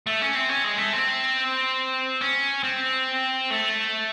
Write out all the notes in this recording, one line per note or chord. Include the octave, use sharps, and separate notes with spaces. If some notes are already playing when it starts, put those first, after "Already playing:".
A3
C#4
C4
C#4
G#3
A3
C4
C#4
C4
A3